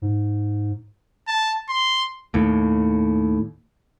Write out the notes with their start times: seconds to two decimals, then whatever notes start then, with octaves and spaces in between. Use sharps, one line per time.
0.02 G#2
1.27 A5
1.69 C6
2.34 D#2 A2